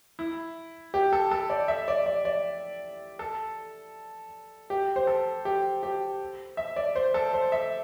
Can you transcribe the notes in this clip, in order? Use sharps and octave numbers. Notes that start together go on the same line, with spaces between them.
E4
G4
A4
A4
D5
E5
D5
D5
D5
A4
G4
C5
A4
G4
G4
E5
D5
C5
A4
C5
E5